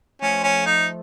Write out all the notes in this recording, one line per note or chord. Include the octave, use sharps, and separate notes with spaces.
F3 A3 C#4
C#4
D#4